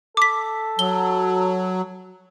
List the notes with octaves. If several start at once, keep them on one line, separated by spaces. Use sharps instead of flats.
A4 D6 B6
F#3 G7